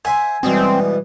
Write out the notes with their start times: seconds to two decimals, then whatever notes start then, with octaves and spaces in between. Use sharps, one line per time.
0.05 C5 E5 F#5 G#5
0.43 G#2 B2 E3 G3 C4